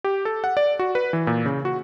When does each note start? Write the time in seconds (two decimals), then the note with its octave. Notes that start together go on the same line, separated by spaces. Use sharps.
0.04 G4
0.25 A4
0.44 F#5
0.57 D5
0.79 F#4
0.95 B4
1.13 E3
1.27 A#2
1.46 C#3
1.65 F#4